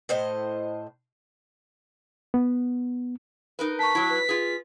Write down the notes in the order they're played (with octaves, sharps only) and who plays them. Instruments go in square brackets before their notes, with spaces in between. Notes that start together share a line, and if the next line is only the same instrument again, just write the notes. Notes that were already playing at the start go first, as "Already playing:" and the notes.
[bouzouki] A2 C5 D#5
[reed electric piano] B3
[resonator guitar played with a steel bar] D#4 A#4 B4
[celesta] A5 C#6 [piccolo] B6
[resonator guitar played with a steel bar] F#3 E4
[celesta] B4
[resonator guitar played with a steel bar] F4 G#4